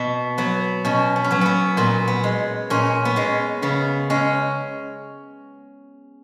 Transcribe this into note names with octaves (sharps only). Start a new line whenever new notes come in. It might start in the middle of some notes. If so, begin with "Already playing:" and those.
Already playing: B2 B3
F#3 B3
B2 C#4
B3
C#4
F#3 B3
B3 C#4
A#2 B3
B3
G#3
A#2 C#4
B3
G#3 C#4
C#3 B3
G#3 C#4